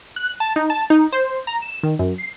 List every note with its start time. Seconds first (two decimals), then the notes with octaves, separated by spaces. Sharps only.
0.16 F#6
0.40 A5
0.56 D#4
0.70 A5
0.90 D#4
1.12 C5
1.47 A#5
1.61 E7
1.83 D#3
1.99 F#2
2.18 C7